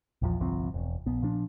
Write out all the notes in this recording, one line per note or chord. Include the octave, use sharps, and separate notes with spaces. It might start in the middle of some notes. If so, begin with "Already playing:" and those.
A#1 E2 F3
G1 C2 F3 C4
E1
A#1 B3
A#2 F3 D4